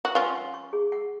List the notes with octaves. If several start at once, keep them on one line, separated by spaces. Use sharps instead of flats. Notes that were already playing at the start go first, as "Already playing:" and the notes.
F#4
C#4 F4 C#6
F#5
C#6
G#4
F#5